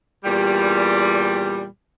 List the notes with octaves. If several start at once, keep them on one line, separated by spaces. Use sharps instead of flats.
E2 A#2 G3